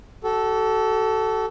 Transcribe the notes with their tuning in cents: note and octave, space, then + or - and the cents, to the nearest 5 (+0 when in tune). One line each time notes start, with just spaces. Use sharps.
F#4 +45 A4 -5